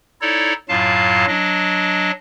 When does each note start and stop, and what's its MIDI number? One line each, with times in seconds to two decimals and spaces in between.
0.21 0.53 63
0.21 0.53 64
0.21 0.53 69
0.21 0.53 73
0.21 0.53 74
0.69 1.26 42
0.69 1.26 45
0.69 1.26 54
0.69 1.26 65
0.69 1.26 77
0.69 1.26 81
1.27 2.11 54
1.27 2.11 62
1.27 2.11 75